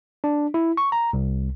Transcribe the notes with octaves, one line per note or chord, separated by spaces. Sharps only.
D4
E4
C#6
A#5
C2